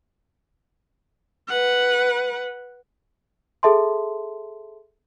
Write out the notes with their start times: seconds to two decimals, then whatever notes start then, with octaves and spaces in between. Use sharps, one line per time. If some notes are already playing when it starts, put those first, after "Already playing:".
1.48 B4 F#5
3.63 G#4 A4 E5 A5 C6